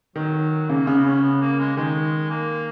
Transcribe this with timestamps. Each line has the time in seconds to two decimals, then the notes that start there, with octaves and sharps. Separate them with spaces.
0.16 D#3 F#3
0.69 C#3 A#3
0.87 C#3 B3
1.05 C#4
1.23 B3
1.41 A#3
1.60 G#3
1.77 D#3 G#3
2.30 A#3